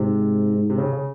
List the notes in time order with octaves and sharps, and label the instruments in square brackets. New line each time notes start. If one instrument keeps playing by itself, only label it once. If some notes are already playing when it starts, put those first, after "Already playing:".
Already playing: [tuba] G#2 [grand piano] C3
[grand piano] C3
C#3
C#3